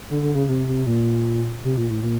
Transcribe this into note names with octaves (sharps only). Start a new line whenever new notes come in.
D3
D3
C#3
C3
C3
A#2
C3
A#2
A2
A#2